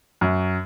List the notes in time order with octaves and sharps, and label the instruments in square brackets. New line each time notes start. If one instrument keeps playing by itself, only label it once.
[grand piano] F#2